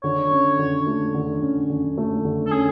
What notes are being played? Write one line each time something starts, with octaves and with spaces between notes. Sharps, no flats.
D3 C#5
C#4
D3
A3
D3
C#4
D3
A3
D3
A4
C#4 G#4